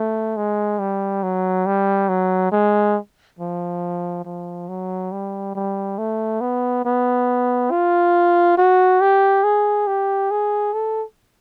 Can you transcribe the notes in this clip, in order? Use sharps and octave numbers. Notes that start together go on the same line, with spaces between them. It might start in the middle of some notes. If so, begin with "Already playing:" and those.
Already playing: A3
G#3
G3
F#3
G3
F#3
G#3
F3
F3
F#3
G3
G3
A3
B3
B3
F4
F#4
G4
G#4
G4
G#4
A4